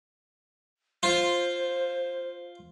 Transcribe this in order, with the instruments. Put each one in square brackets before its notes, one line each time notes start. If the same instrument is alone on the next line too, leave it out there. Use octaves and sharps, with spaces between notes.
[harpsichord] F4 [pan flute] C5